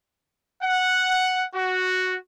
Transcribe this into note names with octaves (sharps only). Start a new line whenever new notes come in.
F#5
F#4